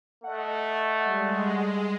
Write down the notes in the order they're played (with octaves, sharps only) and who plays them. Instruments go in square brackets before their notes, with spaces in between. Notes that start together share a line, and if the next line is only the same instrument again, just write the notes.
[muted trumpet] A3 [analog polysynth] D#5 F#5
[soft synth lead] G3 [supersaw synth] G#3